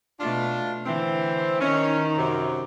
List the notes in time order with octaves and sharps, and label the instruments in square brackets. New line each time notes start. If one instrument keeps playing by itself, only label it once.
[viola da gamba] B2 A3 [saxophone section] D4 F4
[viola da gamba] D3 E3 [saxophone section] C4
[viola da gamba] D#3 D#4 [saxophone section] C#4
[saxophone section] F#2 C3